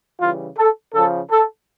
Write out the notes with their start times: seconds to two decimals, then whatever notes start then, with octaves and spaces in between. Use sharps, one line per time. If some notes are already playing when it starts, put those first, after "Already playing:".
0.21 C#3 E3 G3 F4
0.57 A4
0.95 C#3 F3 A4
1.31 A4